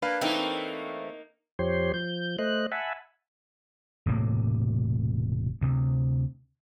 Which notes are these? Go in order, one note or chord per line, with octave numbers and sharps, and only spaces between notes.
A#3 D4 B4 F5
E3 A3 A#3 C4 D#4 A#4
F2 F3 G4 C5 C#5 C6
F3 G6
A3 C5 D#5 F#6
E5 F#5 G#5 A5 B5
E1 A2 C3 A#3
D2 C3